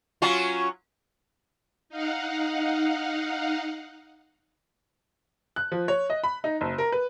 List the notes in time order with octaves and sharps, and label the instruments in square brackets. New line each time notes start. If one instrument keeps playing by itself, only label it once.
[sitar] F#3 C#4 F4
[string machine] D#4 F5 F#5
[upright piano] F#6
F3
C#5
D#5
B5
D#4
F#1
A#4
B4